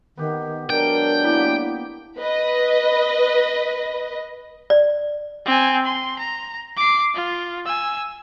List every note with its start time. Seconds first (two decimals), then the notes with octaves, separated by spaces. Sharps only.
0.18 D#3 B3 G4
0.70 F#3 G#3 D4 A#4 G5
1.24 A#3 B3 E4 G4
2.19 B4 D#5
4.70 D5
5.46 C4 G#5
5.86 C6
6.19 A#5
6.77 D6 C7
7.15 F4
7.66 G#5 E6